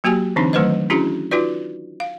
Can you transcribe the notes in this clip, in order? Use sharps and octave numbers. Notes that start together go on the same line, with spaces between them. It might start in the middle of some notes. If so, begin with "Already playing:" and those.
F#3 A#3 F#4 G4 G#5
D3 E3 C4 D4 D#4
D#3 F#3 A3 B4 C5 D#5
C#4 D4 E4 F#4 G#4
D#4 F4 F#4 B4 D5
F5